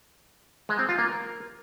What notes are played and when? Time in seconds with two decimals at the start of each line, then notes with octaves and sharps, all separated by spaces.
0.69 G#3
0.79 C4
0.89 F4
0.98 A#3
1.08 A#4